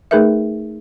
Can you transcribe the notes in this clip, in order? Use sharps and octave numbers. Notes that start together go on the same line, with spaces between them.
A3 D#4 G#4 A#4 B4 E5